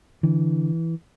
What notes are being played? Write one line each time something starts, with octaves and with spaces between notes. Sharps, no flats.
D3 E3